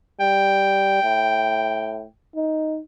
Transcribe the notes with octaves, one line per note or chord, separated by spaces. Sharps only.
G3 G5
A2
D#4